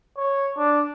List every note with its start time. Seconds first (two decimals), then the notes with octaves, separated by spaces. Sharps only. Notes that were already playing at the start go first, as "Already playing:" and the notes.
0.17 C#5
0.57 D4